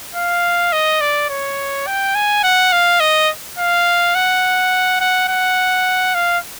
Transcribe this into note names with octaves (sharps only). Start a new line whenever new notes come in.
F5
D#5
D5
C#5
G5
G#5
F#5
F5
D#5
F5
F#5
F#5
F#5
F5